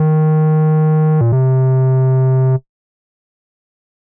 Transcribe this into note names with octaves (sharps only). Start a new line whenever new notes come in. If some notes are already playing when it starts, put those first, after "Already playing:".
Already playing: D#3
A#2
C3